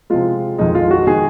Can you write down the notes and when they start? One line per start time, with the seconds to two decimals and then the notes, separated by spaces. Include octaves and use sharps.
0.10 C3 F3 G#3 F4
0.58 F2 D#3 G#3 D#4
0.75 F4
0.91 F#4
1.07 D#3 G#3 G#4